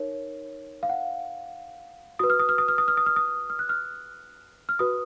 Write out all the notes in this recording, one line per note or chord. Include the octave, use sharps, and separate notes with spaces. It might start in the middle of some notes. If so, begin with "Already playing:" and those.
Already playing: D#4 A#4 C#5
F5
F#5
F#4 B4 D#6
F6
D#6
F6
D#6
F6
D#6
F6
D#6
F6
D#6
F6
F#6
F6
F6
F#4 B4 D#6